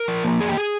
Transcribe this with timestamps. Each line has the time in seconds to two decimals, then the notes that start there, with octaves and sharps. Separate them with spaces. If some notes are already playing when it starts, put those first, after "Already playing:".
Already playing: A#4
0.08 F3
0.24 A#3
0.40 F2 G#4
0.49 G4
0.57 G#4